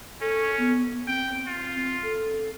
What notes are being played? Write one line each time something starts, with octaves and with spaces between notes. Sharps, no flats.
C#4 A4
B3
C4 G5
F4
A4